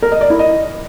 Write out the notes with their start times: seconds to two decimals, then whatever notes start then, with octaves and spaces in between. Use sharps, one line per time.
0.02 A#4
0.12 D#5
0.21 D5
0.30 E4
0.39 D#5